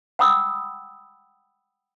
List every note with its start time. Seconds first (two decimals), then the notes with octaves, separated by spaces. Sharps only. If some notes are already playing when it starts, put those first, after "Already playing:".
0.19 F#5 G5 B5 D#6 E6